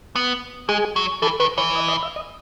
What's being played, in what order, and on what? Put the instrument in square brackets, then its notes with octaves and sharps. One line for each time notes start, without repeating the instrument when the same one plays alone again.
[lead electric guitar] B3
[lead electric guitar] G#3 [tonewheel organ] G#4
[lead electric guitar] F#3
[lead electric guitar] E3 [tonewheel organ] A4
[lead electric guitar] D#3 [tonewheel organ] B4
[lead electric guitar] E3 [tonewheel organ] C#5
[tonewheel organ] D#5
D#5
E5
D#5